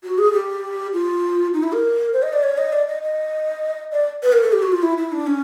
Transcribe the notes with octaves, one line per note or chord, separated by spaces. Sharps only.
F#4
G#4
G4
F4
D#4
E4
A#4
C5
D#5
D5
C#5
D#5
D5
D#5
D#5
D5
B4
A#4
A4
G4
F#4
F4
E4
E4
D4
C#4